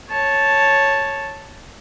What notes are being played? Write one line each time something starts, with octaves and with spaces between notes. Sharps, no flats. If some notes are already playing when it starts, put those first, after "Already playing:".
C#5 A5